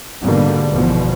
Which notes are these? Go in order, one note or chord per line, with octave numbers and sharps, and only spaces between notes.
G#2 B2 D3 G3 A#3
G1 E2 B2 F3